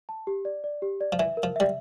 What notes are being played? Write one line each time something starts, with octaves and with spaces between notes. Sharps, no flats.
A5
G4
D5
D5
G4
D5
F3
E3 E5
A#4
F3
G3 E5